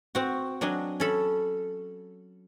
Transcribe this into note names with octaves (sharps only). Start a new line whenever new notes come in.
C4 F#4
F#3 D4 D#5 G#5
C#4 A4 B5